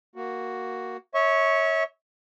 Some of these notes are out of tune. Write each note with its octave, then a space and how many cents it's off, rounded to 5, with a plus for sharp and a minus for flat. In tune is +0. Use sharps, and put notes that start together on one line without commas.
A#3 +0 F#4 +5
C#5 +0 E5 -30 C#6 +0